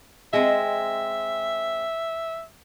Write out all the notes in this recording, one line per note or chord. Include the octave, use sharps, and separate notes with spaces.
G#3 C4 E5